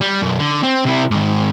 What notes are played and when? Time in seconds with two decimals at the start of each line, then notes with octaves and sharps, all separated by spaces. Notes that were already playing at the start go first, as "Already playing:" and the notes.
0.01 G3
0.22 B1 F#2
0.39 D3
0.63 C4
0.85 C3 E4
1.11 G#2 D#3